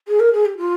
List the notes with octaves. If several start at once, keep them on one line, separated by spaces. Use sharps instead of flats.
G#4
A#4
G#4
G4
F4